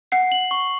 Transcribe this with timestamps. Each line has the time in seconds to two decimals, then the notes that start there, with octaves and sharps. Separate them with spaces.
0.12 F#5 C7
0.32 F#7
0.51 C#6